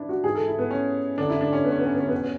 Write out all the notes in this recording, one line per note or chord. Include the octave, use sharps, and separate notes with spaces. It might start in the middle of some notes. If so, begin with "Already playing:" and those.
Already playing: E3 D4 E4
F#4
G#2 E3 G#4
A4
E4
B3
C#4
F#2 D3 D4
E4
D4
C#4
B3
C#4
B3
C#4
B3
C#4
B3
E2 B2 C#4
B3